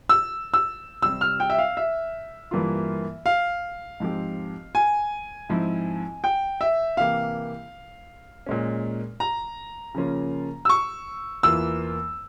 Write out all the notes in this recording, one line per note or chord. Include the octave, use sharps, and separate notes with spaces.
E6
E6
C3 G3 C4 E6
F6
G5
E5
F5
E5
G2 E3 A#3 F4
F5
G#2 F3 C4 G4
G#5
G#2 F3 C4 E4
G5
E5
C3 E3 A#3 E4 G4 F5
A#2 G#3 C#4
A#5
C#3 F3 A#3 C#4 F4
E6
C#6
E2 E3 A#3 F4 E6